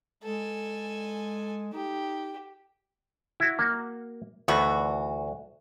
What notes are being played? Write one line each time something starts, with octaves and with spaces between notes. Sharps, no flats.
G#3 A4 G#5
D#4 G4
E4 F#4
A#3 F#4
D2 D#3 E3 B3 F#4